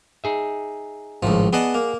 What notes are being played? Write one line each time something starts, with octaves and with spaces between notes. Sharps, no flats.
D#4 G#4 E5
G#1 C#2 A2 F3
B3 G#4 D5 D#5 F#5 A5
A#3